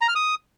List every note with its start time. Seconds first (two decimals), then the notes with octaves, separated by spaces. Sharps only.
0.01 A#5
0.08 F6
0.15 D#6